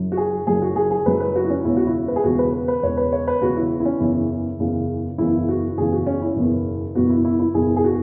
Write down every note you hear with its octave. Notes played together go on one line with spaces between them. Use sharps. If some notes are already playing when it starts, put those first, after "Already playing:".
Already playing: F#1 F#2 F#3
F#4
G#4
F#1 F#2 F#3 G#4
F#4
G#4
G#4
F#1 F#2 F#3 B4
B4
F#4
E4
C#4
E1 E2 C#3 E4
F#4
E4
B4
G#4
E1 E2 C#3 F#4
B4
B4
B4
E1 E2 C#3 C#5
B4
C#5
B4
E1 E2 C#3 F#4
E4
E4
C#4
F#1 E2 C#3 E3 E4
F#1 E2 C#3 E3
F#1 E2 C#3 E3 E4
F#4
F#1 E2 C#3 E3 G#4
F#4
C#4
E4
F#1 E2 B2 B3
F#1 E2 B2 B3 F#4
E4
E4
E4
F#1 E2 B2 B3 G#4
G#4
F#4